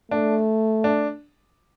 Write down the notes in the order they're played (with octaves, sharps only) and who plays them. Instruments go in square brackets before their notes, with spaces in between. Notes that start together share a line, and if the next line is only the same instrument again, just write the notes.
[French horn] A3 [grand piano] D4
[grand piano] D4